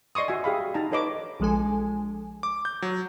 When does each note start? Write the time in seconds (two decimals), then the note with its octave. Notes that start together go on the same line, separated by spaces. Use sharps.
0.15 D5 D#5 C6 C#6 D#6
0.28 F#4 E5 G#5
0.44 G4 G#4 F5 B5
0.74 D#4 A5 A#5
0.91 A4 B4 C#5 D#5 B5 D6
1.40 A#1 F3 G#3 A4 G#5
2.43 D6
2.65 G6
2.82 F#3